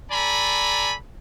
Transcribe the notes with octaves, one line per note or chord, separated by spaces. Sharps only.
A4 D5 G#5 A#5 B5